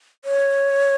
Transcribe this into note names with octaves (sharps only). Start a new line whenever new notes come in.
C#5